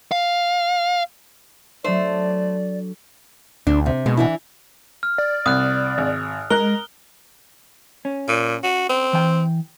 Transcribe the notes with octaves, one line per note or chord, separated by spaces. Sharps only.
F5
F#3 A3 D4 A4 C5 D5
D2 D4
C3
B2 G#3 F#4
E3 D4 E4
F6
D5
C2 D#6 F#6
G#1
G#3 A#4 F#6 G7
C#4
A#2
F#4
C4
E3 G5